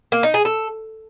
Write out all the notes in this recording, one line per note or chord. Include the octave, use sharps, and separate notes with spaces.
A#3
D#4
G#4
A4